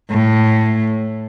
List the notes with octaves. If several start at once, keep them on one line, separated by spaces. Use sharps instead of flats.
A2